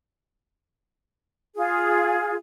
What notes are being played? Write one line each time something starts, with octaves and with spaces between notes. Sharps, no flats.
F4 G#4